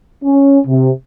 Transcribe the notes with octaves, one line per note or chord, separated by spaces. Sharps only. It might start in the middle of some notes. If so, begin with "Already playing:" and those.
C#4
C3